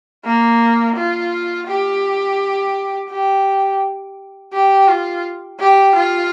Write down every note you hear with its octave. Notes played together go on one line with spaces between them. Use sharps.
A#3
F4
G4
G4
G4
F4
G4
F4